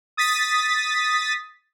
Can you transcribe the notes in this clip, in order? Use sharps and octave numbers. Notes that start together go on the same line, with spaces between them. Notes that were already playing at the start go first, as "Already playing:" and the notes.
D#6 A6 B6